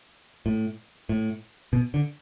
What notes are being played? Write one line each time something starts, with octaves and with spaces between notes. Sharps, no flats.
A2
A2
B2
D3